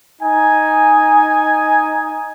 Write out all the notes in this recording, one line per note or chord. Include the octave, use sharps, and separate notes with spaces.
D#4 G#5